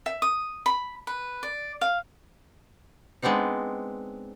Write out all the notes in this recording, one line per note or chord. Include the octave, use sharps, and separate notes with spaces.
E5
D#6
B5
B4
D5
F5
G#3 B3 C4 D4 D#4